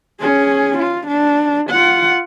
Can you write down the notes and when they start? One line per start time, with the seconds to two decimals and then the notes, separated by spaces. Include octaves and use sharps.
0.20 C#4 G#4
0.78 F4
1.07 D4
1.70 F4 F#5